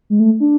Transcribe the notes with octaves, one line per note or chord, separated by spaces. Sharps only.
G#3
A3
D4